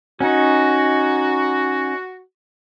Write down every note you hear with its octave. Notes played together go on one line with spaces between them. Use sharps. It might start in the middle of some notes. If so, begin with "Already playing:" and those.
C#4 D#4 F#4